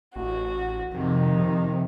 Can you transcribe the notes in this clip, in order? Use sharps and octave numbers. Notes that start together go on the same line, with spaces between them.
A1 F#4
F2 C3 D#3
C3